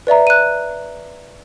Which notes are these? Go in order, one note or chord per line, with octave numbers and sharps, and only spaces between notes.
B4 D5 E5 A#5
F#6 D#7